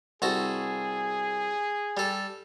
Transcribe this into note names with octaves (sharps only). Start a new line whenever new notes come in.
C2 F#4 G#4 A4
G3 A4